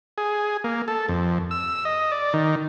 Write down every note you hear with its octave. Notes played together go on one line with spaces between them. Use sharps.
G#4
A#3
A4
F2
E6
D#5
D5
D#3